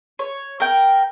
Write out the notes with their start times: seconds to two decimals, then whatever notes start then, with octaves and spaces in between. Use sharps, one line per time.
0.19 C#5
0.60 A#4 G5